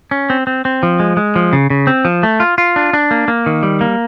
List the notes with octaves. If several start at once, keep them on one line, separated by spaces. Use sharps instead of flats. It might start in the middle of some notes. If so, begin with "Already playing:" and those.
C#4
C4
C4
C4
F3
G#3
G#3
F3
C#3
C#3
C4
F3
A3
F4
F4
D4
D4
A#3
A#3
D#3
G3
A#3